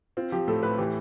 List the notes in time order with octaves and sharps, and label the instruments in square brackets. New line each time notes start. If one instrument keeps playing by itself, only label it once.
[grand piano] C4 [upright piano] F4
[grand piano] F3 [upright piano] G4
[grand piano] A2 [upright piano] A4
[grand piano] A2 [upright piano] B4
[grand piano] E3 [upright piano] G4